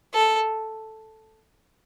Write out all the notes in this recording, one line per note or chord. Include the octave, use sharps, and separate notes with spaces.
A4